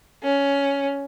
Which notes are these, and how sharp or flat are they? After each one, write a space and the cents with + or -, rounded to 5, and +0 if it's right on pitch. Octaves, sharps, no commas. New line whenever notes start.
C#4 +10